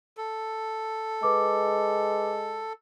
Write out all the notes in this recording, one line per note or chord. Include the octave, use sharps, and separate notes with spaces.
A4
G#3 B4 D6